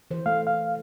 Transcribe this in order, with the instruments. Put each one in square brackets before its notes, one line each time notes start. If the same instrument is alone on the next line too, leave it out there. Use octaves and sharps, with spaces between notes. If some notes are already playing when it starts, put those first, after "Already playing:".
[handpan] E3 C5
[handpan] A3 [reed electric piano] F5
[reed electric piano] F5